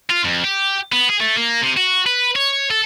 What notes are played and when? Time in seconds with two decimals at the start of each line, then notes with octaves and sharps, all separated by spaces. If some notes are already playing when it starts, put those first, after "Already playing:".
0.10 F4
0.25 F2
0.44 G4
0.92 B3
1.09 G#4
1.21 A3
1.38 A#3
1.62 C3
1.77 F#4
2.06 B4
2.36 C#5
2.70 A4